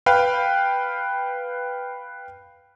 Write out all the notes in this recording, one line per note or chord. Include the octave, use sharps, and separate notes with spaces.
B4 F5 G5